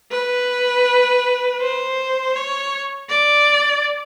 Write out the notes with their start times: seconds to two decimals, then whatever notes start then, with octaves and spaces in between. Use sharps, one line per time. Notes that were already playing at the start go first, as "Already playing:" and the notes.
0.12 B4
1.61 C5
2.35 C#5
3.09 D5